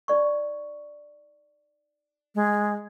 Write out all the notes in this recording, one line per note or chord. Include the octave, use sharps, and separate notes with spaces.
D#4 D5 C#6
G#3